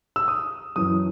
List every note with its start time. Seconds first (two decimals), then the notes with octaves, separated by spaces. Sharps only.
0.16 E6
0.28 D#6
0.76 F#2 E3 D#6